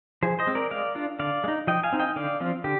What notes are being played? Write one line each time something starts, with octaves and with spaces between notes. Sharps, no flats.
F3 G#4 C5
C5 D#5
G#3 C4
A#4 D5
G#3 D5 F5
D4 F4
D3 D5 F5
G#3
D#4
F3 D#5 G5
F5 G#5
C4 D#4
D#5 G5
D3 D5 F5
F3 C4 F4
D3 G4